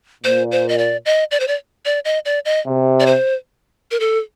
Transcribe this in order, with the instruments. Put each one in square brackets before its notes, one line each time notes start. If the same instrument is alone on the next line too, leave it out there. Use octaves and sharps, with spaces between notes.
[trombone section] A#2 [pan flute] C5
[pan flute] C5
D#5
D5
D#5
D5
C5
D5
D5
D#5
D5
D#5
[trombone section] C3
[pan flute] D5
C5
A#4
A4